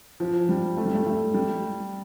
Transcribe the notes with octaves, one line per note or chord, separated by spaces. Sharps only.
F3
G3
A3
G3
A3
A3
G3